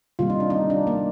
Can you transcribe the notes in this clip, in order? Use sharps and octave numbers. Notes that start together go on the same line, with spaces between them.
C3 D#3 G3 A#3 F4
D#4
D4
D#4
D4
A#3